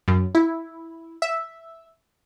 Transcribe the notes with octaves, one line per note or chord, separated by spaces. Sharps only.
F#2
E4
E5